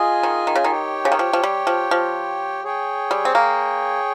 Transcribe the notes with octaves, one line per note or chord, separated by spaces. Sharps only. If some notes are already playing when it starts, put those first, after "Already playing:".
Already playing: F4 G#4 D#5 G#5
D#3
D#3
C#3
D#3
G4 C#5 G5
C#3
D#3
F3
F3
G3
F3
F3
G#4 C#5 G5
G3
C4
A#3